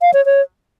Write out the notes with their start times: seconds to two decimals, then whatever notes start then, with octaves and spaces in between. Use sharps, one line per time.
0.02 F5
0.14 C#5
0.26 C#5